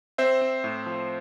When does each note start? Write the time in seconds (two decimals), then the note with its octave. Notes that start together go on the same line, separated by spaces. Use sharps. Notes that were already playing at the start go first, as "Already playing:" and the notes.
0.18 C4 C5 E5
0.41 C4
0.64 A2
0.86 F3